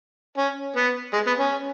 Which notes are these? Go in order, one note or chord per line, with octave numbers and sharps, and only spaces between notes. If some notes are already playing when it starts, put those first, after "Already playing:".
C#4
B3
G#3
B3
C#4